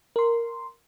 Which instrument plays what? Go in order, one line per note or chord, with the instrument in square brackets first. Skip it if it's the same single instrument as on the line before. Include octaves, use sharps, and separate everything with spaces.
[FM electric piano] A#4 C6